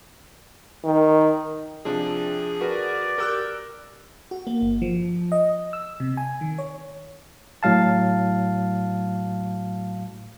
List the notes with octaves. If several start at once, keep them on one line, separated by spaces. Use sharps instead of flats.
D#3
C3 F3 D4 G#4
F#4 A#4 B4 D5
G4 A#4 E6 F#6
F#4
A#3
G1
F3
D#5
E6
C3
G#5
D#3
C#5
A2 F#3 F5 A5